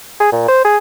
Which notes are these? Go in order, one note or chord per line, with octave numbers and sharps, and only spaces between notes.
G#4
A#2
C5
G#4